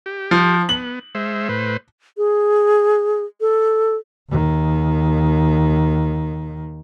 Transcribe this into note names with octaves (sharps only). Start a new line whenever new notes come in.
G4
F3
B3 F#7
G#3 C5 E5
A2 B4 C5
G#4
A4
D#2 D#3